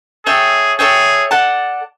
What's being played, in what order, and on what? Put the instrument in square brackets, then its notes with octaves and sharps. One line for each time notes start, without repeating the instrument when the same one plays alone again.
[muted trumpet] G#4 [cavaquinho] A4 C#5 E5 G5
[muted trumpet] G#4 [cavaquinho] A4 C#5 E5 G5
[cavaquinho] A4 D5 F#5 A5